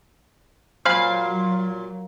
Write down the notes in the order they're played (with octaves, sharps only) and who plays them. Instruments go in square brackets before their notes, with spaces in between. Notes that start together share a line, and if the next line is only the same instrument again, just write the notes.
[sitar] A#2 [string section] F#3 [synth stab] C5 G#5 B5 [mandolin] F5